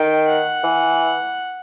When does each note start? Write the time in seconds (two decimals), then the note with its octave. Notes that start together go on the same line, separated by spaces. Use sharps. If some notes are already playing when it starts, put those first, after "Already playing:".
Already playing: D#3 G5
0.28 F#5
0.64 E3